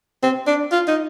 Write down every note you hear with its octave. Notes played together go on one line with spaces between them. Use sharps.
C4
D4
F4
D#4